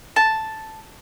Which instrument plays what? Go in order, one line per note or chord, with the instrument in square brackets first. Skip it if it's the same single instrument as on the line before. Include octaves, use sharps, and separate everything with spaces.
[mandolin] A5